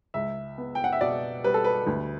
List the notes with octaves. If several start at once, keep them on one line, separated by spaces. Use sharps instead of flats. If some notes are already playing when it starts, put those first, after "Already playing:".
C#2 E5
B3
G5
F#5
E5
B2 D5
G3 B4
A4
B4
D2